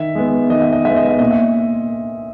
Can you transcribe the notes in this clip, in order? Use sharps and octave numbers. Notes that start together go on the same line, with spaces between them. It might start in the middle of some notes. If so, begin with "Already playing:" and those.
Already playing: D#3 E5
G#3 B3
D#3 D#5
E5
D#5
G#3 B3 E5
D#5
E5
A#2 D#5
E5